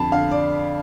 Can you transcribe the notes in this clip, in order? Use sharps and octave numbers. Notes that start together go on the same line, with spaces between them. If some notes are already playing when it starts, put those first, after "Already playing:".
Already playing: F2 D3 A5 B5
D3 F5
D5